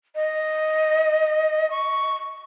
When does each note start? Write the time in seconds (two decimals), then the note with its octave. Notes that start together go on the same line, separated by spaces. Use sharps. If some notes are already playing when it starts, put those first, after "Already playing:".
0.15 D#5
1.71 C#6